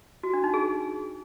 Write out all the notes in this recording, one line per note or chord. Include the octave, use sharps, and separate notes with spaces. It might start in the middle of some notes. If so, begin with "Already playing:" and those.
F#4
D4
D#4
G#4